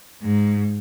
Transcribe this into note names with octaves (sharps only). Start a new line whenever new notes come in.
G#2